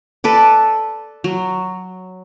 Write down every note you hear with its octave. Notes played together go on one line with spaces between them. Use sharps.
A4 B4 D5
F#3